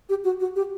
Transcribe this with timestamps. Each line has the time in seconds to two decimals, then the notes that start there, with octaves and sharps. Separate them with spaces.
0.09 G4
0.24 F#4
0.40 F#4
0.56 G4